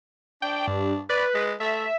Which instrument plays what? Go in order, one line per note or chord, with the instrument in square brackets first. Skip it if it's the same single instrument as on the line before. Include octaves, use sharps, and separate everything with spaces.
[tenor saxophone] D4 [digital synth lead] G5
[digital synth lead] G2
[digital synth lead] B4 [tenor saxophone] D5
[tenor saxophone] G#3
[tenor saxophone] A3 [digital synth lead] E5